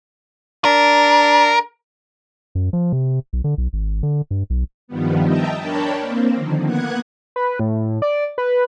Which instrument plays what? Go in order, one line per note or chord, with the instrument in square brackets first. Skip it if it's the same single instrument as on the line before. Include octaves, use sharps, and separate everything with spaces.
[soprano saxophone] D4 [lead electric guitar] A#4
[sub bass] F#2
F3
C3
B1
D3
B1
G#1
D3
G2
B1
[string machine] G2 D#3 F3 G3 B3
D#5 E5 G5 A5 A#5
D4 A#4 C#5 G5 A5 B5
A#3 C4
D3 D#3 F3
A#3 B3 F#5 F#6 G#6
[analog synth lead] B4
A2
D5
B4